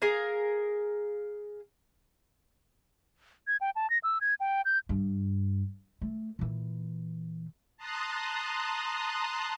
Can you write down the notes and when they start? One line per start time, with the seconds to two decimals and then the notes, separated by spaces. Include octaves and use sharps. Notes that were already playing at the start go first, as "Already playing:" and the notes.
0.02 G#4 A#4 F5
3.47 G#6
3.61 G5
3.76 A5
3.90 A#6
4.04 E6
4.21 G#6
4.40 G5
4.65 G6
4.89 G2
6.01 A3
6.39 A#2 E3
7.77 A5 A#5 C6 D#6 F#6